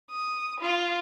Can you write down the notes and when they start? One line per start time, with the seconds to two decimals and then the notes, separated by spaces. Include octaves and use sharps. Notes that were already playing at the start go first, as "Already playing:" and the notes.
0.11 D#6
0.61 F4